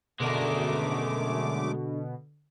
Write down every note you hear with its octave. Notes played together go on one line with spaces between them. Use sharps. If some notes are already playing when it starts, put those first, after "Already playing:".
F#2 B2 D3 G#3 A3 A#4 D6